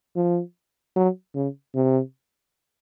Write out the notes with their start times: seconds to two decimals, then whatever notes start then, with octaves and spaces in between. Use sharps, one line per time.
0.16 F3
0.96 F#3
1.35 C#3
1.75 C3